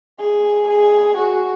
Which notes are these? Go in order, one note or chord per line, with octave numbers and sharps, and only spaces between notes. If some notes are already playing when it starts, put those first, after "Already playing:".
G#4
G#4
F#4